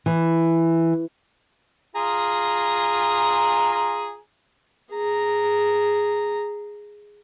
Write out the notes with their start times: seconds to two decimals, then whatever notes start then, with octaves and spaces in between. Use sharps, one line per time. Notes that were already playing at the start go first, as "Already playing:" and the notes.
0.06 E3
1.96 F4 G#4 A#5
4.93 G#4 A#5